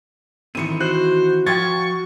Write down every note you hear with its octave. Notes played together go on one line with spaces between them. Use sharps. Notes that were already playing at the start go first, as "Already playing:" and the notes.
D#3 E3 C4 C#7 D#7
F#4 C5 F#6
F3 C5 G5 C#6 G#6 A6